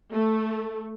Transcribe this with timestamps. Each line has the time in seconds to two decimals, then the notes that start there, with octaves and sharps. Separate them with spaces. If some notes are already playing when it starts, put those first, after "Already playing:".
0.12 A3